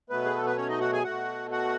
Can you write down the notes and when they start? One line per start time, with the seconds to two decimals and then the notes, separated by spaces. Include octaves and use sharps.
0.10 B2 F#3 A3 B3 B4
0.25 G#4
0.35 A4
0.46 B4
0.57 C#4 C#5
0.68 D#4 D#5
0.80 F#4 F#5
0.92 G#4 G#5
1.04 B2 A3 F#4 F#5
1.51 F#4 F#5